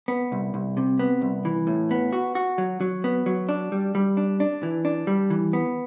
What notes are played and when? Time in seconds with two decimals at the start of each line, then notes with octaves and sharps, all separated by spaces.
0.08 B3
0.32 C2
0.54 C2
0.77 C3
0.99 B3
1.21 C2
1.45 E3
1.67 A2
1.91 B3
2.13 F#4
2.35 F#4
2.58 F#3
2.81 F#3
3.04 B3
3.26 F#3
3.49 D4
3.72 G3
3.95 G3
4.17 D4
4.40 D4
4.63 E3
4.85 D4
5.07 G3
5.30 E3
5.53 B3